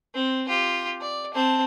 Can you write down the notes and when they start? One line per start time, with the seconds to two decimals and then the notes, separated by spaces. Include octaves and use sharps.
0.14 C4
0.47 F4 G4
1.01 D5
1.34 C4 A5